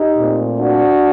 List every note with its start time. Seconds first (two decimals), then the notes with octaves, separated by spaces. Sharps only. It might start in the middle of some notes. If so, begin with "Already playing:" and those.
Already playing: D#4 G4
0.17 A#2 A3 C4
0.58 D4 F#4